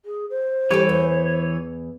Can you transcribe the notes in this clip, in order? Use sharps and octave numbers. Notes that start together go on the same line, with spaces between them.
G#4
C5
E3 G3 G4 A4 C#5
E2